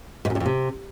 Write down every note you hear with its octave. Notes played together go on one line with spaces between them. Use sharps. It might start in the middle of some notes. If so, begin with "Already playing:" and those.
G#2
F#2
G2
F2
C3